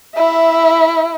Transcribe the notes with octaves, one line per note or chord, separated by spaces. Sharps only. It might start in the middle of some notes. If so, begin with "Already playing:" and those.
E4 E5